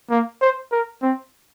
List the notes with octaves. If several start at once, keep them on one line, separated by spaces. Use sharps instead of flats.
A#3
C5
A#4
C4